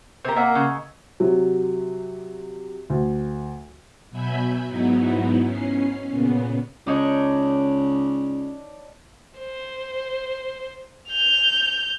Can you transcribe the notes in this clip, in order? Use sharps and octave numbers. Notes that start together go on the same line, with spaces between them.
C3 G4 A#4 C5
A#3 D#5 E5 F#5 A#5 E6
C#3
C3 F#3
D2
B2 F#3 E5 G#5 B5 G6
G#2 F#3 B3 D#4 E4
C#4 C7
A#2 C#3 B3
C#2 D4 D#4 C#5
C5
G6 F7